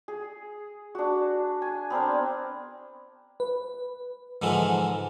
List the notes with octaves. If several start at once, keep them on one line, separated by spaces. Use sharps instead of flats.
G#4
D4 F#4
G#5
B3 C4 D4 A#4
B4
G#2 D3 E3 F3